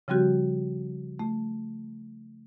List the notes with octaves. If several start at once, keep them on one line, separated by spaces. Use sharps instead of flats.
C#3 F3 G3 C4 F#4 G4
A3